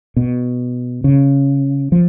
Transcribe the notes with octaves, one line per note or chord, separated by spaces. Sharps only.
B2
C#3
F3